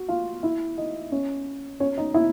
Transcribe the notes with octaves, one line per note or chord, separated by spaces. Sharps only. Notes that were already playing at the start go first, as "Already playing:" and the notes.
Already playing: F#4
F4 F5
E4 E5
D#4 D#5
C#4 C#5
C#4 C#5
D#4 D#5
E4 E5